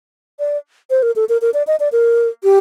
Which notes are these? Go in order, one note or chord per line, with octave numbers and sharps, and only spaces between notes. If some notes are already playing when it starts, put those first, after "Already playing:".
D5
C5
A#4
A4
A#4
A#4
D5
D#5
D5
A#4
G4